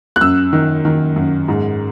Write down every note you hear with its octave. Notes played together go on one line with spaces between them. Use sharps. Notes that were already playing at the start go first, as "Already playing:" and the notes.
F#6
F#2 E6
D#3
D#3
F#2
G#2